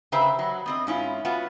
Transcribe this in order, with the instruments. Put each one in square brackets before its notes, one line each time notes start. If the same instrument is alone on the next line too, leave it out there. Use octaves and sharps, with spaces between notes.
[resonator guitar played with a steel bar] C#3 G4 B4 C5 E5 A#5
F#3
B3 C4 D#5
G#2 C#4 E4 F4
B3 C#4 F4 F#4